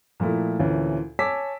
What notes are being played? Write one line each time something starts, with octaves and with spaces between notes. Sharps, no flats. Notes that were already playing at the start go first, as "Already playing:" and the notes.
A#2 F3 A3 E4
D2 A#2 E3 C#4
C#5 G#5 A5 D6 E6 B6